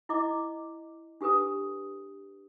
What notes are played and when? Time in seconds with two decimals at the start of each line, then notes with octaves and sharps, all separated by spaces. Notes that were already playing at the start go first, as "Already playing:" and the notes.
0.09 E4 D#5 D6
1.21 D4 G4 A4 B4 D#6